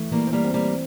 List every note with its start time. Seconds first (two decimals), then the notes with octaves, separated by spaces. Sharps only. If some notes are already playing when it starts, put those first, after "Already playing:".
Already playing: E3 A3
0.11 E3 G3 A#3
0.27 C4
0.32 G3 A#3
0.44 C4
0.54 G3 A#3